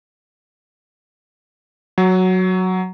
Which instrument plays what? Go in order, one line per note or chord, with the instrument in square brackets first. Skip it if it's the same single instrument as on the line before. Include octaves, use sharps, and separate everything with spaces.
[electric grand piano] F#3